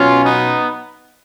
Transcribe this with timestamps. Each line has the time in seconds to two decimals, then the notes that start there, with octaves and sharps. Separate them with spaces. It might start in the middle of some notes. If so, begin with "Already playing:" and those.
Already playing: B2 F#3 C#4 F4
0.24 B3 D#4